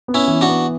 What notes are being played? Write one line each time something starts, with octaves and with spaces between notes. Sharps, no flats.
B3
C#4 E4
E3
D4 F#4
B3